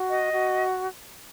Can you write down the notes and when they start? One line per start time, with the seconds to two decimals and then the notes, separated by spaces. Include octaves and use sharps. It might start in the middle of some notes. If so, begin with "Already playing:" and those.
Already playing: F#4
0.09 D#5
0.32 F#4